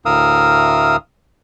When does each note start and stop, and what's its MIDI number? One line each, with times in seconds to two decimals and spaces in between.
0.06 0.96 38
0.06 0.96 45
0.06 0.96 70
0.06 0.96 77
0.06 0.96 87
0.06 0.96 88